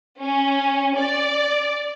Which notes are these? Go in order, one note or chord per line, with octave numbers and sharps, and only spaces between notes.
C#4
D5